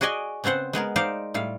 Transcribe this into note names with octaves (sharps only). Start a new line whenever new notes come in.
F#4 G#4 D5 D#5 G#5
C#3 B3 C4 C5 F#5
G#3 B3 G#4 A#4
D#4 C5 D5 F5
A2 G3 F5